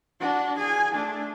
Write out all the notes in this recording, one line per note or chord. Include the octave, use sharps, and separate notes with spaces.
D4 F#4
G#4 G#5
A3 D4